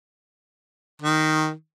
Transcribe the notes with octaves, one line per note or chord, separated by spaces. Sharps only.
D#3